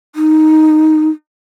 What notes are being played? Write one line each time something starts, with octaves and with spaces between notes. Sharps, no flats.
D#4